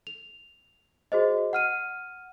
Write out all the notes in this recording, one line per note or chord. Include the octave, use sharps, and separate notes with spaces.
F7
F#4 G#4 C5 D#5
F#5 F6 D#7